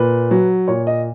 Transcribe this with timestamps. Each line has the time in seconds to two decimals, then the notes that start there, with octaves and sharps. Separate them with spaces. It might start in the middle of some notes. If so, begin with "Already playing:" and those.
Already playing: A#2 B4
0.31 F#3
0.68 A#2 C#5
0.87 D#5